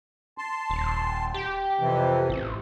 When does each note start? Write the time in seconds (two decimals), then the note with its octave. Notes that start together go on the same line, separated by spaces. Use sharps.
0.38 A5 C6
0.70 D#1
1.34 G4
1.79 F2 C3 E3
2.30 A1